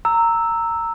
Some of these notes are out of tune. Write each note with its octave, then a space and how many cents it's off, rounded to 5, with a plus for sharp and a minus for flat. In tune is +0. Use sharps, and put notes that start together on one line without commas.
A#5 -15 E6 -5